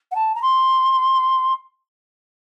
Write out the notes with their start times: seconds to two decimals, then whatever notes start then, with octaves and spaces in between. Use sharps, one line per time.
0.11 F#5
0.15 A5
0.35 A#5
0.42 C6